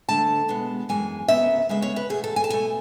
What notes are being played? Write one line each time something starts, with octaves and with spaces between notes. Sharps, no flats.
D2 D3 A3 A5
B2 G#3 B3
F#2 E3 G#3 G#5
D2 C#3 F#3 B3 E5
D2 C#3 G#3 B3 E5
C#5
B4
E2 B2 A3 G#4
A4
G#5
A5
B2 A3 G#5